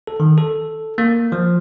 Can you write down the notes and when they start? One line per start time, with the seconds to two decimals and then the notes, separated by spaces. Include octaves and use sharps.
0.07 A4
0.20 D#3
0.38 A4
0.98 A#3
1.32 F3